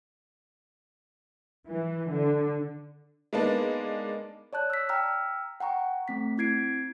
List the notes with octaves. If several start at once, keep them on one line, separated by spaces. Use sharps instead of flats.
E3
D3
G#3 A#3 B3 D4 D#4
C#5 D5 A5 F#6 G6
E6 B6
G5 A#5 E6 F6
F#5 G5 A#5 C#6
A3 C4 B6
C4 E4 G#6 C7 D7